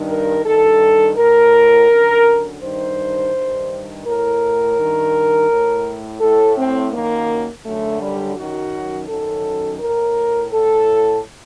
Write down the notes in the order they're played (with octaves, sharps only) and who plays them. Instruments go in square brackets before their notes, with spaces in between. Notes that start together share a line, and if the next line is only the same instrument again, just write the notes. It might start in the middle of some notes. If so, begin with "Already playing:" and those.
Already playing: [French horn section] G2 D#3
A#4
G2 D#3 A4
A2 A#4
F#2 D3
G2 D#3 C5
G2 D#3
A2 A#4
G2 D#3
A2
A2 A4
C4
F#2 D#3 A#3
F#2 D3 A3
G3
F#2 D#3 F#4
F#2 D#3 A4
A2 A#4
A2 A4